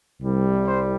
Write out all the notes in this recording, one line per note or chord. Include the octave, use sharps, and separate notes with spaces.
C2 C3 G3
C5